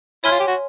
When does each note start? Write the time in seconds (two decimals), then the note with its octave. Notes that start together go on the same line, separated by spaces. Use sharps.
0.24 E4 C#5 E5 G#5 C6 F6
0.32 F4
0.40 G4
0.47 F#4